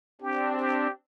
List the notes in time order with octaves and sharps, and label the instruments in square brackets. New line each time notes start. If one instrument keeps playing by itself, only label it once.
[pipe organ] C4 D4 [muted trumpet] G4
[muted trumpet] G4